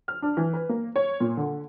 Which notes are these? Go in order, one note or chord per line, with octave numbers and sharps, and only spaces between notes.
F6
D4
E3
B4
A#3
C#5
A#2
D3